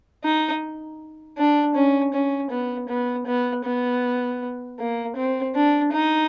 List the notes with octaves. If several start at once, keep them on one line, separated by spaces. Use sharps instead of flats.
D#4
D4
C#4
C#4
B3
B3
B3
B3
A#3
C4
D4
D#4